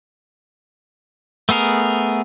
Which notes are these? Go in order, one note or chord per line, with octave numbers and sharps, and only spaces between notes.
A3 B3 G#4 A#4